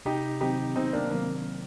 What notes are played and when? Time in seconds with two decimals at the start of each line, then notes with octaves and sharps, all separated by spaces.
0.05 C3 D#4 G4
0.41 D#3 F#3 C4 D#4 G4
0.76 C3 C4 D#4
0.93 A#3 D4
1.11 D#3 F#3 A#3 C4